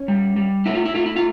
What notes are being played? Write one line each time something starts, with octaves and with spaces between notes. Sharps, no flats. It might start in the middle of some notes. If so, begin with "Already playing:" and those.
Already playing: C#4
G3
G3
A3 E4
F4
E4
A3 F4
E4
F4